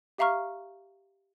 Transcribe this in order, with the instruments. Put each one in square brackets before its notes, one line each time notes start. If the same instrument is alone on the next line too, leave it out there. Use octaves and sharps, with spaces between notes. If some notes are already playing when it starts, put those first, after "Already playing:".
[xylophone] G4 E5 F5 A#5 C#6 F6